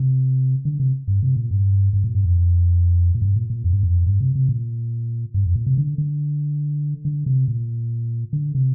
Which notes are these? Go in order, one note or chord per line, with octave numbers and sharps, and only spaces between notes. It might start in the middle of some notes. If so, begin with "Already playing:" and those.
Already playing: C3
D3
C3
G2
C3
A#2
G2
G2
A#2
G2
F2
A#2
G2
A#2
A#2
F2
G2
F2
G2
C3
C3
A#2
G2
F2
A#2
C3
D3
D3
D3
C3
A#2
D3
C3